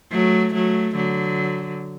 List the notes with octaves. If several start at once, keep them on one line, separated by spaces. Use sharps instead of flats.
F#3 A3
F#3 A3
D3 F#3